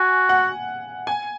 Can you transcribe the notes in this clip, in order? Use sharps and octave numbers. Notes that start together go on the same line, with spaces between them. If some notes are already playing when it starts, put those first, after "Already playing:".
Already playing: F#4 G#5
F#5
G#5